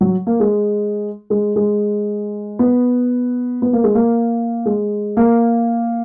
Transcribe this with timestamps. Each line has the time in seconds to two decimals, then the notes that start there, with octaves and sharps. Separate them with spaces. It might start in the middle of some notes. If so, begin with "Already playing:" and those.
0.01 F#3
0.27 A#3
0.40 G#3
1.30 G#3
1.56 G#3
2.59 B3
3.62 B3
3.73 A#3
3.84 G#3
3.95 A#3
4.66 G#3
5.17 A#3